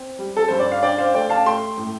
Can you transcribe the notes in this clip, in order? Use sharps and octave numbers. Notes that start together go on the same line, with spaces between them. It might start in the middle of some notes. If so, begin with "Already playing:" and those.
Already playing: C4
G3
A4
G2 C5
D5
F5
D4 D5 G5
C5 F5
A3 D5 G5
F5 A5
A3 G5 C6
A2